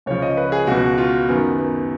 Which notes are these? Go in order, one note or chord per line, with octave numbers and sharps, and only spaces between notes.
C#2 C#3 F3 C#5
D#5
B4
G#4
C#2 B2 F#4
F4
F#2 D#3 B3
B3